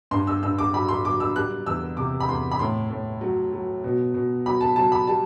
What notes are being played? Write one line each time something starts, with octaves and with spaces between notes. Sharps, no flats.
G2 C6
E6
G2 E6
D6
F#3 B5
C6
F#3 D6
E6
G3 F#6
E2 E6
C3 D6
B5
E2 C6
B5
A2 C6
A2
F#3
F#3
B2
B2
F#3 B5
A5
F#3 A5
B5
G3 A5